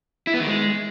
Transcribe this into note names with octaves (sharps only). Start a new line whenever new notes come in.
E4
B3
D#3
G#3